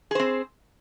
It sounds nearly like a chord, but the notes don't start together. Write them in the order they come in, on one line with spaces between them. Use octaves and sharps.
G#4 C5 C4